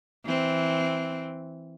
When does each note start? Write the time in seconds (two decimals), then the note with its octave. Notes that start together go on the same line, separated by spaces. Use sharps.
0.25 E3 C4